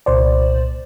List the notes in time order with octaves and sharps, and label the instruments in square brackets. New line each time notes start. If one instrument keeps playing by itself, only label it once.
[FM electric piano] C2 A#2 C5 D5